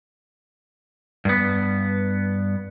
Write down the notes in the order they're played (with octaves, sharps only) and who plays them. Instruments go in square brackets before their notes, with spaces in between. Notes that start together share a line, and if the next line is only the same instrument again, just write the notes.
[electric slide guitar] G2 B3